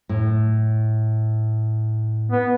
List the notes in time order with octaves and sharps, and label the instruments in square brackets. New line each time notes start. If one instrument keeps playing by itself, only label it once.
[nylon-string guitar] A2
[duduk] B3